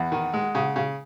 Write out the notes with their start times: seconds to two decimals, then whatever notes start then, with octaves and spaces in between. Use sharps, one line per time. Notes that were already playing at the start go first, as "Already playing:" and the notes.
Already playing: E2 F#5
0.12 D#3
0.34 G#3
0.55 C#3
0.76 C#3